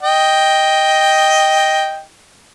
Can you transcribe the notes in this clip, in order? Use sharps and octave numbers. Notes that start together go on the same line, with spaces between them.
D#5 G5